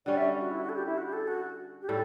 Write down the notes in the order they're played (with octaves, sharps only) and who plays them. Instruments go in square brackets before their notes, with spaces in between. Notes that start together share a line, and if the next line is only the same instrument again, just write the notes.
[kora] D3 G3 C#4 [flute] D5
[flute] E5
F#4
E4
F#4
A4
G4
E4
F#4
G4
A4
F#4
G4
[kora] A2 G3 [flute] A4